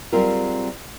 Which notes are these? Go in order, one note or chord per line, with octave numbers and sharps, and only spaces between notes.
F#3 G3 C4 F4 G#4 A#4